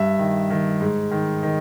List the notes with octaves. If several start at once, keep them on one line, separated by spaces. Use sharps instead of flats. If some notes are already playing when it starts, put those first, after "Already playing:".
Already playing: G2 E5
D#3
D#3
G#2
D#3
D#3